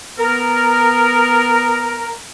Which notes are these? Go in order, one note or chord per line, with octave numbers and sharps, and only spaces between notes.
B3 A#4